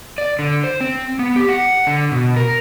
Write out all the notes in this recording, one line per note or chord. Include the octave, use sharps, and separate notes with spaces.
D5
D3
C5
C4
B3
G4
F#5
D3
B2
A#4